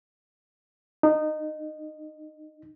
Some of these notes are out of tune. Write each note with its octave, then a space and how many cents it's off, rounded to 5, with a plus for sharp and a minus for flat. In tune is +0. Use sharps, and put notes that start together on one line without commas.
D#4 -20